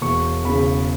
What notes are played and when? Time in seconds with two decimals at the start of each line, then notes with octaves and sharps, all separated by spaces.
0.02 E1 C#6
0.45 E2 C#3 B5